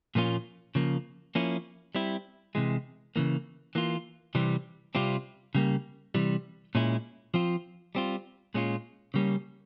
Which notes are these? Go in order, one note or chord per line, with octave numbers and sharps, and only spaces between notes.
A#2 F3 A#3 C#4 F4
C#3 F3 A#3
F3 A#3 C#4 E4
G3 C4 E4
C3 E3 G#3
C#3 E3 A#3
E3 A#3 F4
C3 E3 G3 C4
C3 G3 C4 F4
C#3 G3 A#3
C3 E3 G3
A#2 G#3 C#4 E4
F3 C4 F4
G3 C4 F4
A#2 G#3 C#4 F4
C#3 G3 A#3 C#4